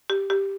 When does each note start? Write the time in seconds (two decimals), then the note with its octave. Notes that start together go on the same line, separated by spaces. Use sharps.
0.10 G4
0.30 G4